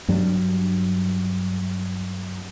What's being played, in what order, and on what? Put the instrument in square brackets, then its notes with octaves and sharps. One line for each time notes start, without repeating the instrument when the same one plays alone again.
[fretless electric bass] G2 F#3 G3 D4